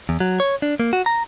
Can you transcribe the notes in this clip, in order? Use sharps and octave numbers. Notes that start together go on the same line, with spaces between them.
E2
F#3
C#5
D4
A#3
F#4
A#5